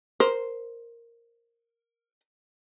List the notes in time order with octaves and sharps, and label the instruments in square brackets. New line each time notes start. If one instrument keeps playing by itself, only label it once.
[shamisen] A#4 C5